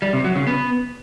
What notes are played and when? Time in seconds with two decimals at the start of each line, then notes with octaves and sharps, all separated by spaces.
0.02 G3
0.13 C3
0.24 F#3
0.36 C#3
0.47 B3